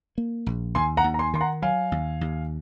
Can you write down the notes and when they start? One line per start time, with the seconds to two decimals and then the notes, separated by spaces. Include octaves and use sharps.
0.18 A#3
0.46 A#1
0.75 D#2 G#5 C6
0.97 F#5 A#5
1.04 D#2
1.14 A#5
1.19 G#5 C6
1.34 D#3 C6
1.41 F#5 A#5
1.62 F#3 F5 G#5
1.92 D#2
2.21 D#2